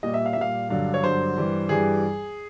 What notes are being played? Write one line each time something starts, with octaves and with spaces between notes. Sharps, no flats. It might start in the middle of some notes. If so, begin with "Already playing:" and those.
A#2 G3 D#5
E5
F5
E5
A#2 G3 F5
G2 D3 F#3 F5
C#5
G2 D3 F#3 C5
G2 E3 G3
G2 E3 G3 G#4